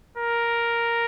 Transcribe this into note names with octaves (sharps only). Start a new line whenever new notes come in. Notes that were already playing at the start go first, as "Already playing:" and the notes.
A#4